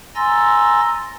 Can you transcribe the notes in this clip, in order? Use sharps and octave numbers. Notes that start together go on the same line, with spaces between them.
G#5 A#5 C6 E6 A6 A#6